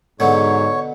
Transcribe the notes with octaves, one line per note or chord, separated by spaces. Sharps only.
G#2 B2 D3 F#3 C#5